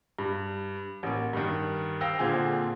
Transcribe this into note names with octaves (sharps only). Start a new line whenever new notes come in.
G2
A1 A#3
G2 D#3
F5 G5 E6 A#6
A#2 D3 C4 F4 G#4